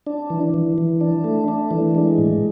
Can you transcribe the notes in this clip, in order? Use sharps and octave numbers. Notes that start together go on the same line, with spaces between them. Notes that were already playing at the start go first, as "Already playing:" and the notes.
D4
E3
E3
E3
D4
A3
D4
E3
G#3
A2